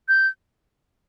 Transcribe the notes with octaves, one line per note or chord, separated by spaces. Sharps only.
G6